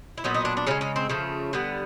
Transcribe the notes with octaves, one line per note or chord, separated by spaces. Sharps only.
E4
A#2 F#3 B3 D#4
D#4
D4
D4
C#3 F3 G#3 C#4
C#4
C4
C#3 F3 A3
D3 G3 B3